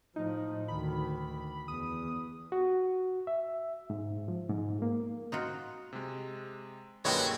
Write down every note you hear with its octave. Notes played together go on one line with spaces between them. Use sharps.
A2 F3 D#4
D2 D#3 B5
E2 D#6
F#4
E5
G#2
F3
G#2
A#3
D#4 F4 F#4
C3 G#3
F#2 A#2 D3 G#3 F#4 G4 B4 C#5